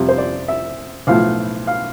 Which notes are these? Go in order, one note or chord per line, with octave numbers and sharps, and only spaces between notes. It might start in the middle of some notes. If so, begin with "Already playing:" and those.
Already playing: F2 C3 G3
C5
D5
E5
B1 A2 F3 A3 F5
F5